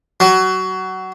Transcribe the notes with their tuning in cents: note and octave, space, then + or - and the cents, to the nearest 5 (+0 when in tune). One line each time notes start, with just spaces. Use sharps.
F#3 +20